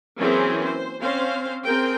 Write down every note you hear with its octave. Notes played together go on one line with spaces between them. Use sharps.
E3 F#3 A#3 C4 C#4 G#4
C5
C4 C#4 C5 F5
C4 G#4 A#4 G5